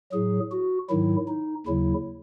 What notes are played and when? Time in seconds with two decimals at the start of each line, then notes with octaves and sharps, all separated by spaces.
0.12 A2 F#3 G#4
0.52 F#4
0.89 G#2 D#3 F#3 E4
1.28 D#4
1.66 D#2 C#3 F#3 E4